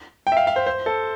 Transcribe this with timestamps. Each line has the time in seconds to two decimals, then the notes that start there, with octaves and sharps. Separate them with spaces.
0.27 G5
0.32 E5
0.37 F5
0.47 F5
0.56 C5
0.66 C5
0.86 A4